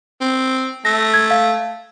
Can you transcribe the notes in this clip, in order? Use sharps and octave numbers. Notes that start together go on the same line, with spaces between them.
C4
A3 A#6
G#6
F5